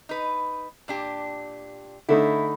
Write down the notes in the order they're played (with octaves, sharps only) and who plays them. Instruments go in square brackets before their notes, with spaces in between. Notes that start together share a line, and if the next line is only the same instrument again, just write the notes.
[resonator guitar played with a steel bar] D#4 B4
A#2 D4 G4
[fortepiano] D3 A3 D#4 [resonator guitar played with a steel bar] E4